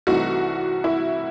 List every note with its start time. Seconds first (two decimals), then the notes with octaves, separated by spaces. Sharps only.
0.07 C2 C3 E3 A3 D#4 F#4
0.84 E4